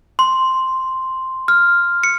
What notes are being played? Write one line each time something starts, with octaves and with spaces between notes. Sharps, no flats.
C6
F6
C#7